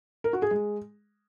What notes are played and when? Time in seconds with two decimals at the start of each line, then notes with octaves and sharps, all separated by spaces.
0.24 A#4
0.33 F#4
0.42 G#4
0.51 G#3